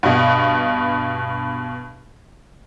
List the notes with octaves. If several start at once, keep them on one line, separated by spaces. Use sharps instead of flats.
G2 B2